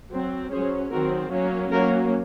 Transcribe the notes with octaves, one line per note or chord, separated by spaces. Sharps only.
F#3 C4
F#3 C#4 G#4 C5
D#3 F#3 C4 F#4 A#4
F#3 A#3 C#4
F#3 A#3 C#4 F#4 A#4